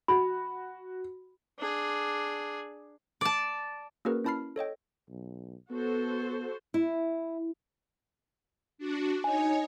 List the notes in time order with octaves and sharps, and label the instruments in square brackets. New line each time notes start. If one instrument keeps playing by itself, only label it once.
[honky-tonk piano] F#4 [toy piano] B5
[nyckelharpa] D4 G#4
[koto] D5 A5
[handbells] A#3 C#4 F#4 G#4 A#4 B4
C#4 E4 A5 B5 F6 C7
A4 C#5 D#5 G5
[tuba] B1
[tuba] B3 [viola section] F#4 A4 C5
[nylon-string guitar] E4
[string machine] D4 F#4
[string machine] D#4 C#5 D#5 [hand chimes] G#5